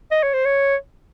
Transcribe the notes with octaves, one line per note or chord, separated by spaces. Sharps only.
D#5
C#5
C5
C#5